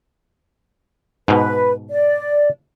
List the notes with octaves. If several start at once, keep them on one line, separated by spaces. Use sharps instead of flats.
G#2 B2 B4
D5